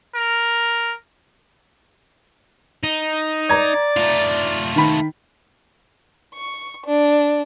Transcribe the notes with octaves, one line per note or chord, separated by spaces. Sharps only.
A#4
D#4
D5 A#5 G#6
A3 F4
D#3 B5
C#6
D4